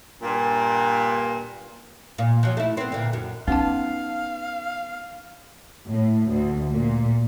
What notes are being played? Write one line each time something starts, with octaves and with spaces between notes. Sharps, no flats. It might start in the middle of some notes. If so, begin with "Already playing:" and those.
G2 A#2
A#2
F3 F#3
A3 E4
B3 C4
A#2 D3
F#2
B3 C#4 D#4 F4 F5 A5
A2
D2
A#2